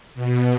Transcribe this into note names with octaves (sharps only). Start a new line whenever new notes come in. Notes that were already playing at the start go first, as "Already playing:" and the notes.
B2